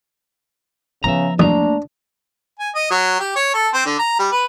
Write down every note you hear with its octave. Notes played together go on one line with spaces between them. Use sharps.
C#3 F3 B3 E5 A#5
B1 E2 A3 A#3 D4 A#5 D#6
G#5
D#5
F#3
G4
C#5
A4
C4
D3
A#5
G3
B4